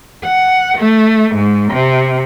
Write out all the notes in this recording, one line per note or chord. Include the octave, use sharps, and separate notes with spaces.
F#5
A3
G#2
C3